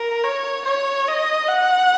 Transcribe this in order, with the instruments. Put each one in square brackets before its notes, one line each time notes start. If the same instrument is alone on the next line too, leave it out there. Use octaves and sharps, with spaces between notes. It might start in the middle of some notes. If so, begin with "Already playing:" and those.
Already playing: [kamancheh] A#4
C#5
C#5
D#5
F#5